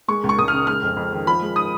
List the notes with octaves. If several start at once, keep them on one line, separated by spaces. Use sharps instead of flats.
G#3 C#6
C#2
C#6
C#2 D#6
C#3 F6
G#3 F6
F2
F2
D#3
F3 B5
G#3
D#6